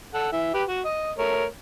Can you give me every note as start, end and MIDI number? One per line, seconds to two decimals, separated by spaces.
0.14 0.29 69
0.14 0.29 78
0.32 0.51 52
0.32 0.51 76
0.54 0.63 67
0.54 0.63 71
0.68 0.81 66
0.85 1.11 75
1.18 1.45 57
1.18 1.45 70
1.18 1.45 73